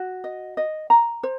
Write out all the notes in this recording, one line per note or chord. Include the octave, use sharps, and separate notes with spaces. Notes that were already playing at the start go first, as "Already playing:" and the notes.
Already playing: F#4
D#5
D#5
A#5
C5